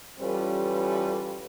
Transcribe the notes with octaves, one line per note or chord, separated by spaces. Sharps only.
E3 G3 C#4 F4 A4 B4